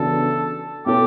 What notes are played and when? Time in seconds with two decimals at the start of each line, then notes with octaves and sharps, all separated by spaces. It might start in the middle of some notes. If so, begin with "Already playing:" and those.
Already playing: C#3 E3 B3 D4 F#4 A4
0.86 B2 A3 C#4 E4 G4 A4